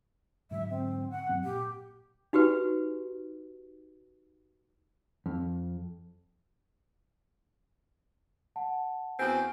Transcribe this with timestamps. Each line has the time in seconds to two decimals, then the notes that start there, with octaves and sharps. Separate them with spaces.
0.51 G#2 D3 F#3 E5
0.70 C4
1.11 F#5
1.29 G2 F#3 C4
1.45 A#2 G4
2.33 D#4 F#4 G4 B4
5.26 F2
8.56 F#5 A5
9.19 E2 C4 F#4 G#5